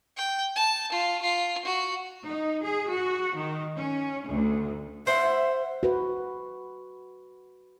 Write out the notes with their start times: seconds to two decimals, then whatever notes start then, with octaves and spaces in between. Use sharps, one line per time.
0.17 G5
0.55 A5
0.92 F4
1.22 F4
1.65 F#4
2.27 D#4
2.62 G#4
2.91 F#4
3.37 D#3
3.76 C#4
4.27 D2
5.07 C5 E5 F#5
5.83 F#4 B4